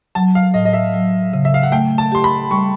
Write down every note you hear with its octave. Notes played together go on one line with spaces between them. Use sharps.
F#3 A5
F5
A2 D#5
D#5
E5
F#3
C#3
E5
F5
F#5
A3 G5
A5
G4 C6
B5
G3 C#6